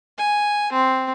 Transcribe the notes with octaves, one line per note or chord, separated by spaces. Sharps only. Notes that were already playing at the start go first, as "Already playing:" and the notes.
G#5
C4